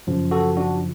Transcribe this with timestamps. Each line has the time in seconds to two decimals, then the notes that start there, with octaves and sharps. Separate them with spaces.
0.07 F#2 C#3 F3
0.31 F#4 A4
0.57 D4 F#4